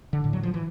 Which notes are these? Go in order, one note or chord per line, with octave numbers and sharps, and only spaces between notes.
D3
A2
F#3
F3
E3